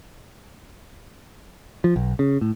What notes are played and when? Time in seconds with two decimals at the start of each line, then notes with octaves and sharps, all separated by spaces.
1.84 F3
1.96 B1
2.19 C#3
2.41 A2